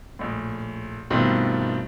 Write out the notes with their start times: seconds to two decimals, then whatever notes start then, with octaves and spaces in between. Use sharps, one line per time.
0.19 A#1 A2
1.10 G2 B2 D#3 A3 C4 F4